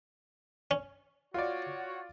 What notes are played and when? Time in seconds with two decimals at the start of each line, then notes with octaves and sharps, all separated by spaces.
0.71 C#4
1.34 F4 F#4 C#5 D5